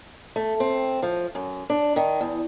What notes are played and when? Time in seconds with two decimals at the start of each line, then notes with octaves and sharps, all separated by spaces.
0.36 A3
0.60 C4
1.03 F3
1.35 F#2
1.70 D4
1.96 D#3
2.21 E2